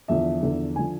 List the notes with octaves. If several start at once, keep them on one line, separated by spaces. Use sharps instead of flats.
E2 D3 F3 E5
E2 D3 F3
D3 F3 G#5